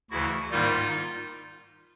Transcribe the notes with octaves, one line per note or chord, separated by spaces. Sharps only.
D2 C#3 E3 E4 F#4
G#2 D#3 G3 A#3 D#4 F4